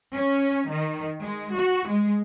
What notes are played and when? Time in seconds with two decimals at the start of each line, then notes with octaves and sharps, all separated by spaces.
0.15 C#4
0.69 D#3
1.21 G#3
1.56 F#4
1.87 G#3